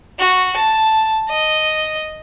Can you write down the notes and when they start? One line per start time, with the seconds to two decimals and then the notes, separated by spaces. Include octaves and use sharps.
0.19 F#4
0.56 A5
1.30 D#5